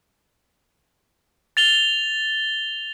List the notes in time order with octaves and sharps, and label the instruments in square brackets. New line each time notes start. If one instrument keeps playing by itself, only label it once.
[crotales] A6 F7 G7